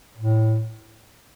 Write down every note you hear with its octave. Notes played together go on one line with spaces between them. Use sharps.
A2